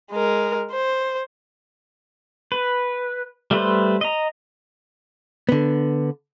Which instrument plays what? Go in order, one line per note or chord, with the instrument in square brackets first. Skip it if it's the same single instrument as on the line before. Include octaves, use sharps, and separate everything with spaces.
[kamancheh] G#3 A#4
C5
[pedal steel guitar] B4
G3 A3 B4 C5
D#5 A#5
[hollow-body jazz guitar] D3 B3